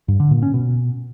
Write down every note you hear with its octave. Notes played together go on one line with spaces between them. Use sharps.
G2
D3
A#2
C#4
B2